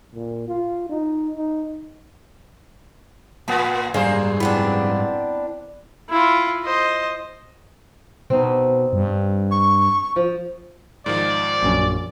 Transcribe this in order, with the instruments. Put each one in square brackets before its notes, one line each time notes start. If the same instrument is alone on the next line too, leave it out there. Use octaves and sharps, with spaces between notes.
[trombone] A#2
F4
D#4
D#4
[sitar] A2 A#3 B3 [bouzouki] B4 [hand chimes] A5 A#6
[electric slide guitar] G#2 G3 [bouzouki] A#3 [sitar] G#4 C5 [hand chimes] D5
[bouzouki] B3 C4 D4 [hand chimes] E4 B5
[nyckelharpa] E4 F4
C5 D#5
[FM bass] B2 [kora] C4 D#4
[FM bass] G2
[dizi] C#6
[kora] F3
[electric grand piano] G#2 D#3 F3 [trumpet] D5
[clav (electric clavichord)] A#1 F#2 C#4